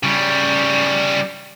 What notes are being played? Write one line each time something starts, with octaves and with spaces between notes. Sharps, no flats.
C#3 G3